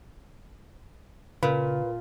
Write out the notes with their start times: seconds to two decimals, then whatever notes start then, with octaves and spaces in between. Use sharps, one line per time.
1.43 A#2 C#3 F4 B4